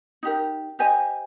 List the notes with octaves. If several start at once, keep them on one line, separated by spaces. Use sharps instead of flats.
D#4 G4 A#4
G4 C5 D#5 G#5